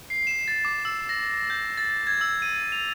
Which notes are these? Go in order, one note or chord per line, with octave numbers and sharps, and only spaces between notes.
C7
E7
A6
D6
E6
A#6
G6
A6
G#6
E6
D#7
F7